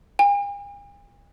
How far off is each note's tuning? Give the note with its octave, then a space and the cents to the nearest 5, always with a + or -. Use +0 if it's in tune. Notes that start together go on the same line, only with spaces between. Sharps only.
G#5 -45